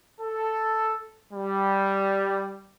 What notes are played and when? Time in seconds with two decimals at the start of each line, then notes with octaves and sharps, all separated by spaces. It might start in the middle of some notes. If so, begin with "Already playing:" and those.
0.20 A4
1.32 G3